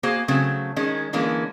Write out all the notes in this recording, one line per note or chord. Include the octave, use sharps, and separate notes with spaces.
A#3 F#4 G#4 C5 F5
C#3 F#3 A3 C4
D#3 G#3 C#4
D3 E3 G#3 A#3 C#4